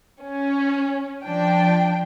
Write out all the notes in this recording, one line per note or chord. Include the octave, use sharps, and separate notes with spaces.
C#4
F3 D4 G5